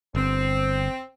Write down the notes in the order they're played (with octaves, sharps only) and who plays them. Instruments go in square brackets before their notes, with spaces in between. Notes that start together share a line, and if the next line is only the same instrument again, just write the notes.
[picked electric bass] G1 [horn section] C4